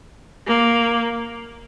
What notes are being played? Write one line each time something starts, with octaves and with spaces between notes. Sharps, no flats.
A#3